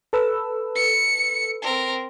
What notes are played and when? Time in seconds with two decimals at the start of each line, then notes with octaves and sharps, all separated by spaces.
0.13 A4 B4 E6
0.75 C#7
1.62 C4 A#4